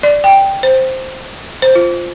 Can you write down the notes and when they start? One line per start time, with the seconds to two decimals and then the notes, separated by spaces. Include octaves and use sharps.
0.03 D5
0.24 G5
0.63 C5
1.62 C5
1.75 F4